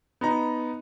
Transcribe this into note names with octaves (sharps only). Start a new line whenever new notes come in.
B3 D#4 A#5